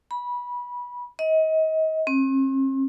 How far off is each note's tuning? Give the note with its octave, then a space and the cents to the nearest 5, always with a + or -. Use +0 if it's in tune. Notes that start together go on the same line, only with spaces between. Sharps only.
B5 -20
D#5 +30
C4 +45